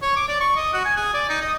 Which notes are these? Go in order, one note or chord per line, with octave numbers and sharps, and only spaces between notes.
C#5
D6
D5
C#6
D#5
F#4
G#5
G#4
D5
D#4
D#5